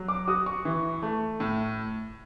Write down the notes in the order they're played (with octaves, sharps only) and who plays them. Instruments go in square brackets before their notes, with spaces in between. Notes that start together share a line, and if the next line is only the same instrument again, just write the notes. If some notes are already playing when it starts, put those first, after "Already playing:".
Already playing: [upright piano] F#3
[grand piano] D6
[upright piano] F#4 [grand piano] D#6
[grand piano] C#6
[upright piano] E3
A3
A2